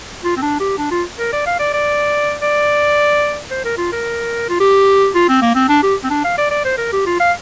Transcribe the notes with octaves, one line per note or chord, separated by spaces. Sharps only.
F4
C4
D4
G4
D4
F4
A#4
D5
F5
D5
D5
D5
C5
A#4
F4
A#4
F4
G4
F4
C4
A#3
C4
D4
G4
C4
D4
F5
D5
D5
C5
A#4
G4
F4
F5